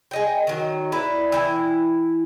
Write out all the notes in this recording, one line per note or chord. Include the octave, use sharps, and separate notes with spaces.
G#4 D#5 G5
D#3 F#3
E4 B4 D5
E3 E4 G5